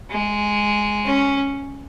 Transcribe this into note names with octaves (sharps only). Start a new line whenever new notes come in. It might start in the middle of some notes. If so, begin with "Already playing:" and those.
G#3
C#4